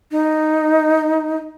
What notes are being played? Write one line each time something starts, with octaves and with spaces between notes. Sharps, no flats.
D#4